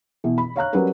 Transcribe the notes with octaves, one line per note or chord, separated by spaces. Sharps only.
B2 E3
B5
C#5 F5 A#5 F#6
F#3 G3 C#4 A#4 B4